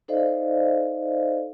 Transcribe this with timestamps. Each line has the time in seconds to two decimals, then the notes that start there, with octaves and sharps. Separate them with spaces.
0.08 D#4 A4 C5 D5 D#5 F5